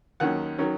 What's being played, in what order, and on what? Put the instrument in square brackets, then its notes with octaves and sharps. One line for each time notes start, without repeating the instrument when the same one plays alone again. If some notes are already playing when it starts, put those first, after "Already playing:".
[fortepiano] D#2 D#3 F#3 C#4 F#5
D#3 F#3 C#4